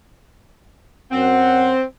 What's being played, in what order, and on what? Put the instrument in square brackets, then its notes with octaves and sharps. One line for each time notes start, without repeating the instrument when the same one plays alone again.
[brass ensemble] F#2 F#5 [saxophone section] C4